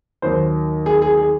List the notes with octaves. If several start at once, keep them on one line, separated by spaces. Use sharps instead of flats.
D#2 D#3 F#3 C5
G#4
G#4
G#4